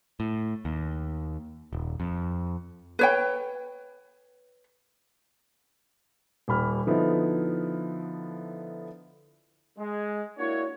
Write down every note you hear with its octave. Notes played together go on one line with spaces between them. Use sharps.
A2
D#2
D#1
F2
B4 C#5 G5
D#1 G3 B5 F6
D3 F3 B3 D#4 E4
G#3
A#3 D4 E4 F#4 C#5